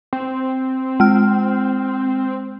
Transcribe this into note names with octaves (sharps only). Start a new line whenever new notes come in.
C4
G#3 F6